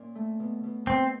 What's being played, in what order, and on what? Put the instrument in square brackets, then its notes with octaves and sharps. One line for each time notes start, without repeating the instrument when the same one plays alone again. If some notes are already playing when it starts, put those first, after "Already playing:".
Already playing: [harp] A#2 C#4
A3
B2
B2
[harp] B2 [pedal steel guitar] C4